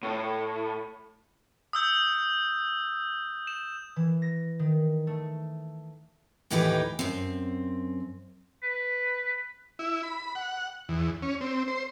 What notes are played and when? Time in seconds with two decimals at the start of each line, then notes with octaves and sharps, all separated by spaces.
0.03 A2
1.73 D#6 E6 G6
3.47 E7
3.96 E3
4.22 A#6
4.59 D#3
5.07 A3
6.50 D#2 A2 E3 D#4 G4 B4
6.99 F#2 C4
8.63 B4
9.79 E4
10.03 B5
10.35 F#5
10.89 E2
11.22 C#4
11.41 C4
11.68 C5